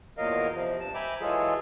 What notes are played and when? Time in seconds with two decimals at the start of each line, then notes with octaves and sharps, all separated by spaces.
0.18 E2 A#2 F#3 A#4 D#5 F5
0.54 C3 F3
0.80 G2 A5
0.95 E5 G5 G#5 A#5 B5 D6
1.21 E3 F#3 G#3 F4 G#4 A4